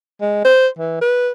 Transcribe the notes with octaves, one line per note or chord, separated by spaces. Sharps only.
G#3
C5
E3
B4